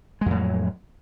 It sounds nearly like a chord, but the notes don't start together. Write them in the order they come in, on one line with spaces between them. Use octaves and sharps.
G#3 F2 A2 F#3